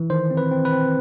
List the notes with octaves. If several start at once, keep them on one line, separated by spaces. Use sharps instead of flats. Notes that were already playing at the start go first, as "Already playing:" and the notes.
Already playing: E3
D#3 C5
C4
B4
C4
B4
C4